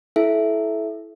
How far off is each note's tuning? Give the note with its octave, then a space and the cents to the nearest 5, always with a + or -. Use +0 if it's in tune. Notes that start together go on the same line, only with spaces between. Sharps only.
E4 +0 A4 -25 E5 +0